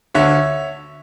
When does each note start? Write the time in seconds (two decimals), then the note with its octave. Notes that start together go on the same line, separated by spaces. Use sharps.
0.15 D2 D3 C#5 E5